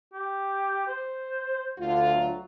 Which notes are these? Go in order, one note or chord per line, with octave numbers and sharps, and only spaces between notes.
G4
C5
D2 D3 F4
F#3